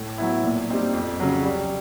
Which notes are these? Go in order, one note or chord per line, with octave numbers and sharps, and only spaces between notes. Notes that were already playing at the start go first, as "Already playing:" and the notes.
Already playing: A2
F#3 B3 E4
A#2
G3 C4 D#4
F2
C#3 F#3
G3